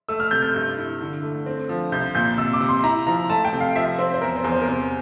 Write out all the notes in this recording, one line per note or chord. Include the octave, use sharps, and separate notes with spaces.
A3 E6
F6
C3 G6
G6
G2 G6
E4
D3
A3
C4
F3
C2 G6
A#2 G6
C3 E6
D6
C3
C6
E4 A#5
F3 A#5
A3 A5
G5
C3
F5
F3 E5
C4 C5
C5
E2 A#4
C5
E2
C5
A#4
C3 C5